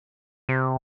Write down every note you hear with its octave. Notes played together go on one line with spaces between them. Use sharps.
C3